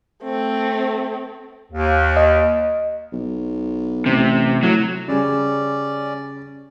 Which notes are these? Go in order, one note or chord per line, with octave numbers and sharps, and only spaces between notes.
A3 C4
D#2
D#5
B1
A1 C3
A2 F#3
C#3 G3 C#4 D5